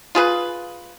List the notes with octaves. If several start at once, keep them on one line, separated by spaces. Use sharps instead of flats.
F4 G#4 B4